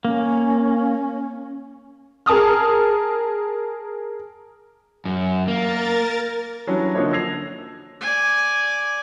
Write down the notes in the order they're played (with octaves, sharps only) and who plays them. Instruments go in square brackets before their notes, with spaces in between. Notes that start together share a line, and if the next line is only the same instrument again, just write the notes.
[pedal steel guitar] A#3 [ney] C#4
[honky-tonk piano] G#4 A#4 A5 D#6 F6
[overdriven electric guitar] F#2
[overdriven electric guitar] A#3 [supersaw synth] A#4 A6
[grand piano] E3 F#3 G3 C#4 D4
D3 F3 A#3 D4 D#4 C#5
E6 G#6 A#6 C7 F7
[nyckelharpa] D5 G#5